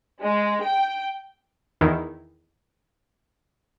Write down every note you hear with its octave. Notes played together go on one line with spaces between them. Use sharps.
G#3
G5
E2 D#3 E4